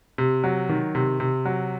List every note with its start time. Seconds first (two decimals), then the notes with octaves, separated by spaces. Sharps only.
0.18 C3
0.44 F#3
0.69 D#3
0.95 C3
1.20 C3
1.45 F#3